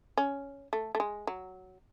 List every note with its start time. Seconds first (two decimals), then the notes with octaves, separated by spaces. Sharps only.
0.18 C#4
0.73 A3
0.95 A3
1.00 G#3
1.27 F#3